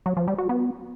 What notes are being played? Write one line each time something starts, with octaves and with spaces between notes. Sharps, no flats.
F#3
F3
G3
F#4
B3